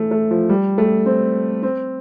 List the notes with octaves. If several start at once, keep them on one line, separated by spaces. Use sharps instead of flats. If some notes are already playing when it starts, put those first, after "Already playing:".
Already playing: E3 A3
A3
F3
G3
A3
C4
C4